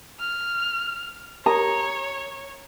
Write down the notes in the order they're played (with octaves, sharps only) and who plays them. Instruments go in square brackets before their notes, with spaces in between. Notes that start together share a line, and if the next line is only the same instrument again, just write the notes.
[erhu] F6
[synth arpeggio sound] G4 A#4 D#6 [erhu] C#5 [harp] A#5